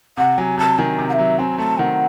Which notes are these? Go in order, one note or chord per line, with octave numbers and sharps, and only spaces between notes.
C3 F#5
F#3 G#5
C3 A5
D#3 G#5
C3
F#5
E5
F#3
C4 G#5
A3 A5
D#3 F#5